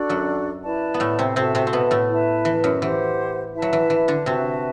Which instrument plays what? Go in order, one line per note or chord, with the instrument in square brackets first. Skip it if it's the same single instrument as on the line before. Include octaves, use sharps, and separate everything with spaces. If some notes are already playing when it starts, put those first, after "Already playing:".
Already playing: [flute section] D4 F#4 A4 D5
[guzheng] F#2 F#3
[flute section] E4 B4 D5 A5
[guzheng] B3
A2 A3
C3 C4
[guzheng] C3 C4 [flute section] F#4 A4 E5 A5
[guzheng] C3 C4
C4
B2 B3
A2 A3
[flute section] E4 B4 E5 A5
[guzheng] E3
F#2 F#3
[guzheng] E3 [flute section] G4 C5 F#5
[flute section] E4 B4 E5 A5
[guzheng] F#3
E3
E3
D3 D4
[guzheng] C3 C4 [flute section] F#4 B4 E5 A5